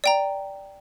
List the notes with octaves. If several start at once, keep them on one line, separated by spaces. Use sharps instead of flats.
D5 G5 A#5